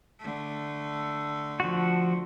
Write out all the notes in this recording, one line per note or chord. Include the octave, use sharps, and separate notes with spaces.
D3 A3
F3 F#4